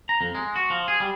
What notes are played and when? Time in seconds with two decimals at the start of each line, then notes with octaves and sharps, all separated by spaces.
0.09 A#5
0.21 F2
0.35 G#3
0.56 F#4
0.70 F3
0.88 G#4
1.00 G3